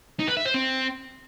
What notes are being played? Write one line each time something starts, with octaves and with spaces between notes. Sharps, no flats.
D#4
B4
E5
C5
C4